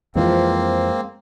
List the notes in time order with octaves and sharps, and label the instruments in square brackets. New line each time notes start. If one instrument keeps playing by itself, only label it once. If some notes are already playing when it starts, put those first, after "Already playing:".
[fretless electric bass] F2 E3 F3 [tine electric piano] G#3 [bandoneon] A#3 C4